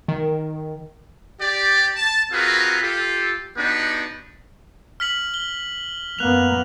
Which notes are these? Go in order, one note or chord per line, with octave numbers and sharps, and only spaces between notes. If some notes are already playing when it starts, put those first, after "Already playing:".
D#3
G4 D5
A5
C4 F4 F#4 G#4 A#4 B4
F4 G4 A4
B3 D4 D#4 F#4 G4 B4
F6 B6 F#7
G7
F#2 A#3 B3 F#6 F7